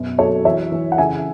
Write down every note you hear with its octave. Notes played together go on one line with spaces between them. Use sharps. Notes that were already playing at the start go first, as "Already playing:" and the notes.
Already playing: F#2 B2
F#3 A4 C#5
E3 C#5 E5
E3
F#5
C#3 E5 G#5